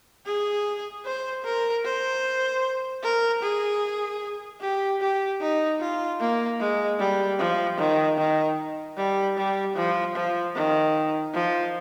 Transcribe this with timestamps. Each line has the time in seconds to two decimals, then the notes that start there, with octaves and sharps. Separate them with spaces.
0.26 G#4
1.05 C5
1.45 A#4
1.85 C5
3.03 A#4
3.43 G#4
4.61 G4
5.01 G4
5.41 D#4
5.80 F4
6.20 A#3
6.60 G#3
6.99 G3
7.39 F3
7.78 D#3
8.18 D#3
8.97 G3
9.37 G3
9.76 F3
10.16 F3
10.55 D#3
11.34 F3